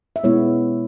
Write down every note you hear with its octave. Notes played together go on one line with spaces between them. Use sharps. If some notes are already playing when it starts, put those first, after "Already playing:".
E5
B2 G#3 B3 E4 C#5